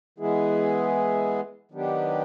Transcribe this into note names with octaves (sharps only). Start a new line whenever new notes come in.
E3 G#3 B3 E4 G#4
D#3 F#3 B3 D4 G4